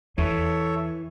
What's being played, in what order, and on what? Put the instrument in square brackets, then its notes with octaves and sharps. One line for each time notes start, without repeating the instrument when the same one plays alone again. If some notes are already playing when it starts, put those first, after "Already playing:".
[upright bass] E2 [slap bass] E3 [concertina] A4 C#5 E5